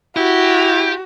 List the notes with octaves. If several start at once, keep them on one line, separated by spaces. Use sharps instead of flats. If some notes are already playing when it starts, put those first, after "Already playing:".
E4 F#4 G4